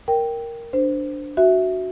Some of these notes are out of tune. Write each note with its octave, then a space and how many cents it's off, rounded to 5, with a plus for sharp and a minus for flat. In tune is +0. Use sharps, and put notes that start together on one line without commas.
A#4 +0 G5 +0
D4 +0 C5 -15
F#4 +0 E5 +0